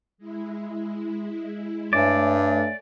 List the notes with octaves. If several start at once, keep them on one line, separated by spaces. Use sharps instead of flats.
G#3 E4
G2 A3 C#5 D5 E5 G#5